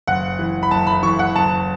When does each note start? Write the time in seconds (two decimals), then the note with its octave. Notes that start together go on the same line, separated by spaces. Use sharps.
0.07 F#1 F#5
0.39 E3
0.63 B5
0.71 F#1 A5
0.87 B5
1.03 E3 C#6
1.19 F#5
1.35 F#1 A5